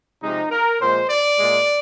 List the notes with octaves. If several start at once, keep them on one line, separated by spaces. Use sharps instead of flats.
C3 F3 G#3 D#4
A#4
A#2 F3 G#3 C5
D5
A#2 G#3